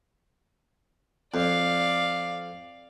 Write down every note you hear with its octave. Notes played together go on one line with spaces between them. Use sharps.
F2 D5 F5